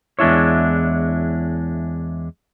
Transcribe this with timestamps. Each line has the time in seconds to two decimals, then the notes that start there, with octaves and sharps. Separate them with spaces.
0.19 E2 G#3 D4 E4 C#5